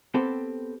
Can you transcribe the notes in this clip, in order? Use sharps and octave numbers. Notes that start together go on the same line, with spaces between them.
B3 C4 G4 A4 C5